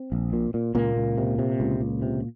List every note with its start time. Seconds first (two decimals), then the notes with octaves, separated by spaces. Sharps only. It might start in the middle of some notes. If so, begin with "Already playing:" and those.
Already playing: C4
0.12 A#1
0.33 A#2
0.54 A#2
0.75 C#2 A#2 A#3
0.96 C#2
1.18 C3
1.39 C3
1.60 C#2
1.80 C#2
2.02 C3